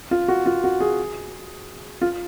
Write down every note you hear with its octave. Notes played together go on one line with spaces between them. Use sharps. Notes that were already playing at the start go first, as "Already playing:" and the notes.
F4
F#4
F4
F#4
G#4
F4